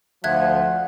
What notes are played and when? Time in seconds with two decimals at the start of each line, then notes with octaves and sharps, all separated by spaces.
0.24 D2 F3 E5 F#5 F#6 G#6